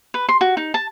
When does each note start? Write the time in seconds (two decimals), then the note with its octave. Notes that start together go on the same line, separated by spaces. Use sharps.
0.14 B4
0.29 C6
0.41 F#4
0.57 D#4
0.74 A5